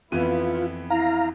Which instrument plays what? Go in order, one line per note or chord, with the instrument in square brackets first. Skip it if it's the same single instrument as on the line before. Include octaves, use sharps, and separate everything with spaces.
[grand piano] F2 E3 D#7 [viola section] B3 E4 [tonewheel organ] F4
[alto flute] E4 [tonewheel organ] F5 A#5